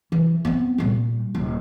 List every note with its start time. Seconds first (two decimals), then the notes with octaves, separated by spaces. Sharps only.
0.12 E3
0.45 B3 C4
0.78 A#2 G3
1.35 D#1